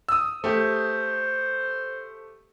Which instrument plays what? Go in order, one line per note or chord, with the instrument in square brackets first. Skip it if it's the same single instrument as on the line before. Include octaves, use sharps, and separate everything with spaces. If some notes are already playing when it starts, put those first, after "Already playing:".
[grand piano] D#6 E6
[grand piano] A3 G4 [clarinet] C5